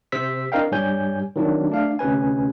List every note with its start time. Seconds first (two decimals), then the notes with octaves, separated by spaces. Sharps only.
0.12 C3 C5 E6 B6
0.52 C4 D4 A#4 D#5 F5 G5
0.72 G2 G3 G4 C#5 G#5 G6
1.36 D#3 F#3 C4 D4
1.70 A3 D4 F5
1.99 D2 C3 C#4 B4 G#5